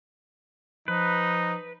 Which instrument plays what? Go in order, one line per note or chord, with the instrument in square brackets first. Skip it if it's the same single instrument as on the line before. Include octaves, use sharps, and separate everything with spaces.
[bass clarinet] F3 [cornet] D#4 [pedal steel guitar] B4